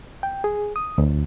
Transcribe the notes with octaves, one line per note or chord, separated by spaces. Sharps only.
G5
G#4
D#6
D2